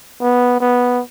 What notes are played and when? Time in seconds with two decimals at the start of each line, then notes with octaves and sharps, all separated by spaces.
0.20 B3
0.60 B3